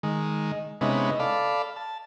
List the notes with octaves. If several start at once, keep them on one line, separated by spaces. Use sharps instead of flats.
D#3 G#3
C3 G#3 B3 C#4 D#4 E4
A4 D5 F5 B5
A5